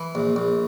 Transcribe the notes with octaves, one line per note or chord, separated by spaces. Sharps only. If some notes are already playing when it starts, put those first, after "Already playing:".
Already playing: E3
A#1
A#1